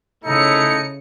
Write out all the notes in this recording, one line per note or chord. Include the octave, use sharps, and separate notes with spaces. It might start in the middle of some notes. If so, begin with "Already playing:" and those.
C#3 A3 D#4 E4 C#7